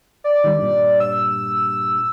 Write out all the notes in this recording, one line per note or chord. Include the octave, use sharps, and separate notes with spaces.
D5
D#3 G3
G2 A#2
E6